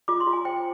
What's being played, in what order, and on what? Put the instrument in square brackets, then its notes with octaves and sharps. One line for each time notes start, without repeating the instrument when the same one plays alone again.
[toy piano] F4 D6
C6
F4
G#5
C5 G5